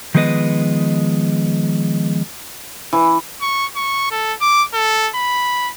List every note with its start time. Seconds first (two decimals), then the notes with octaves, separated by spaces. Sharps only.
0.15 D#3 F3 G#3 B3 B4 D#5
2.93 E3
3.41 C#6
3.76 C#6
4.11 A4
4.41 D6
4.74 A4
5.15 B5